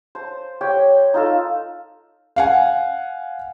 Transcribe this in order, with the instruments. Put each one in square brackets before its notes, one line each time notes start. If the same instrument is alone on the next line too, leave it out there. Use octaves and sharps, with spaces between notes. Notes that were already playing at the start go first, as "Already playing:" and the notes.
[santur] C5 A5
G4 C#5 G5
D#4 F4 A4
[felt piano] F5 F#5 G#5